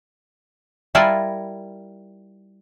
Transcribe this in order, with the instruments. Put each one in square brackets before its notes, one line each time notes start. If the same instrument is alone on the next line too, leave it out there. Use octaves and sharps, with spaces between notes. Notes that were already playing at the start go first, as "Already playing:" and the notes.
[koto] G3 E4 F4 A#4 G#5 A5